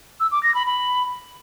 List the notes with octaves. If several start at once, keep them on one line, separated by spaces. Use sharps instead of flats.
E6
D6
A#6
B5
B5